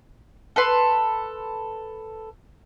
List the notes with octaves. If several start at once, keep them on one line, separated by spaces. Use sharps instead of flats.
A4 B4 C6